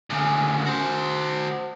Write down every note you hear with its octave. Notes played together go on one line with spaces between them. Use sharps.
D2 C#3
F#4 C5